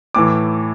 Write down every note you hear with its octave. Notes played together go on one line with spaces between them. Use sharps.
A2 E3 D6